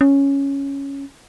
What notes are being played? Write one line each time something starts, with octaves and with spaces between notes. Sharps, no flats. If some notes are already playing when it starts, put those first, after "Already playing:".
C#4